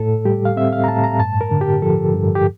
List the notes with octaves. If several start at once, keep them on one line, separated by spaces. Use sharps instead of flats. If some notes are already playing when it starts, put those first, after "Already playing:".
Already playing: A2 A4
G3 G4
F5
C4 E5
F5
A#5
A2 A5
A#5
G2 A5
A#4
D3
G4
F3 A4
G2
G4